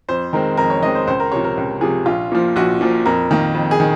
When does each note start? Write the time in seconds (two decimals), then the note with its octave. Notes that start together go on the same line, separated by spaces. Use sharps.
0.08 F2 C5
0.33 D#3 G#3 C4 A#4
0.57 F2 A#4
0.70 C#5
0.82 D#3 G#3 C4 D#5
0.95 C5
1.07 C#2 C5
1.20 A#4
1.32 C3 F3 C#5
1.44 A#4
1.57 C#2
1.81 C3 F3 G#4
2.06 A#1 F4
2.32 A#2 F3
2.56 A#1 F#4
2.81 A#2 F3
3.06 F2 A#4
3.31 D#3 A#3
3.54 F2
3.71 G#4
3.80 D#3